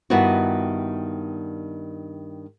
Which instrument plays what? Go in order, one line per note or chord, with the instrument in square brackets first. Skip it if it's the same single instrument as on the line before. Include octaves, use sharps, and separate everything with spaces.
[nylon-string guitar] G2 D#3 B3 D#4 E4 F#4